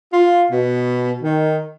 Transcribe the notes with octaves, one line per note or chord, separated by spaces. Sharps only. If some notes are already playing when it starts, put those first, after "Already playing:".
F4
B2
D#3